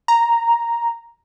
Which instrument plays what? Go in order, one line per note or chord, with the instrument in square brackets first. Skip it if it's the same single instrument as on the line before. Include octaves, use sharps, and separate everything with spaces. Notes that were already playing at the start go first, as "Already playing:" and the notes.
[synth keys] A#5